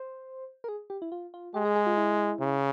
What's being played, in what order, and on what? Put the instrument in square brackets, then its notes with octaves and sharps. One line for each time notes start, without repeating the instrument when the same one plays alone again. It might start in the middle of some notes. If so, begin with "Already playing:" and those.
Already playing: [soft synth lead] C5
A#4
G#4
G4
E4
F4
F4
[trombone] G#3 [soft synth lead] G4
[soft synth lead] G#4
G#4
F4
E4
[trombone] C#3